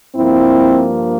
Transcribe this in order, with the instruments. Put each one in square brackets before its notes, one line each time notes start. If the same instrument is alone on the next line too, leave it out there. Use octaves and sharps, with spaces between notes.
[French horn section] G2 F3 A#3 C4 E4